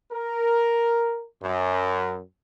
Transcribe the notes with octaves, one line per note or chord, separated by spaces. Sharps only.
A#4
F#2